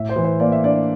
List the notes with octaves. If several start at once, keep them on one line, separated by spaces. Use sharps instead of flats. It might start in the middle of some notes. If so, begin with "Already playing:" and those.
Already playing: A2 E5
C5
E3
C5
A#3 D5
E5
D4 D5